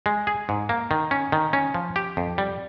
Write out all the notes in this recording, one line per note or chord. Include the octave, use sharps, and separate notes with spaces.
G#3
G#4
G#2
A#3
D#3
C#4
D#3
C#4
F3
G4
F2
G3